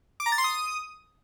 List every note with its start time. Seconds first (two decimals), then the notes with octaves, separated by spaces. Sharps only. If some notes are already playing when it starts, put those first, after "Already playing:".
0.20 D6
0.26 A#5
0.32 A6
0.38 C6
0.44 D#6